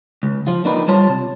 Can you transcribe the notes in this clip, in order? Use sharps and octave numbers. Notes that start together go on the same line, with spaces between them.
C#2
F3 F4
A#3 D4 D#4 B4
G3 F4 C5 C#5 A5 C6
C3